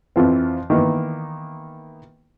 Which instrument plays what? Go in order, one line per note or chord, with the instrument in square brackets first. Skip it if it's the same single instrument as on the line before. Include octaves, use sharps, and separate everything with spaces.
[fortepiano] F2 E3 F3 C4
D#3 E3 A#3 B3